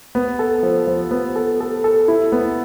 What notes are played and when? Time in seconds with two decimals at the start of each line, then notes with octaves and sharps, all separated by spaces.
0.15 B3
0.39 A4
0.63 F3
0.87 F3
1.11 B3
1.36 A4
1.60 A4
1.84 A4
2.08 E4
2.32 B3